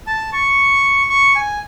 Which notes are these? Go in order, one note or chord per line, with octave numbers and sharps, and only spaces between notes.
A5
C#6
C#6
G#5